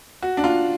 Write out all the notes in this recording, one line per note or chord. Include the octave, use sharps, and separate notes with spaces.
F#4
D4
F4